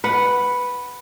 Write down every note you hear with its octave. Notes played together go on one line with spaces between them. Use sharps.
B4 F#5